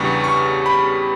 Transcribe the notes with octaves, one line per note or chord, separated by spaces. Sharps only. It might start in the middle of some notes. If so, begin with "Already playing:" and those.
Already playing: E2 C#3 G3 B3 D4 C#6
C#6
B5